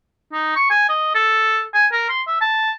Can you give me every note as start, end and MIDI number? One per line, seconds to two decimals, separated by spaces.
0.33 0.51 63
0.56 0.70 85
0.70 0.86 80
0.89 1.10 75
1.15 1.63 69
1.74 1.87 80
1.92 2.04 70
2.09 2.22 84
2.27 2.36 76
2.41 2.72 81